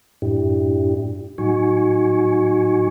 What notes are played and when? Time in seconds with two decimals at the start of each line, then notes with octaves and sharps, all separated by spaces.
0.22 F#2 A2 D4 E4 G4
1.38 A2 F#3 D#4 F#4 G#5 C#6